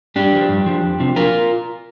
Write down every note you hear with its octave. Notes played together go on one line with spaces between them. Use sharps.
G2 D4 G4
F3
G2
F3
F2
C3 F3
F4 A#4